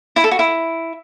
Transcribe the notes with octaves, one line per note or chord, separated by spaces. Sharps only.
E4
A4
F#4
E4